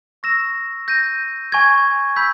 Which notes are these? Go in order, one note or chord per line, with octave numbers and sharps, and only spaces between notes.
C#6 E6 A#6 E7
G6 A#6 D#7
G#5 C#6 G#6
B5 E6 G6 B6